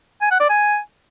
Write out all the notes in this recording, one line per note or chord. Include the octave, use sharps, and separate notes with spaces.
G#5
F#5
D5
G#5